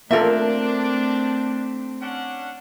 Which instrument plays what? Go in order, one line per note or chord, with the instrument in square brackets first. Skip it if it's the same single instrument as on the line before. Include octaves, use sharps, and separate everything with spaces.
[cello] A3 C4 [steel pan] A#3 F4 A4 [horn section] D4 [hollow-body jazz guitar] A#4 E5
[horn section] C#4 D4 F#5